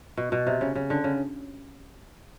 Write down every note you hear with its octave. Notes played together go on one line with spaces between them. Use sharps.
B2
B2
C3
C#3
C#3
D3
C#3